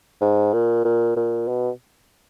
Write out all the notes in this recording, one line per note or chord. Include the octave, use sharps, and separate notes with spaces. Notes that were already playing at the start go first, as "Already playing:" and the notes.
G#2
A#2
A#2
A#2
B2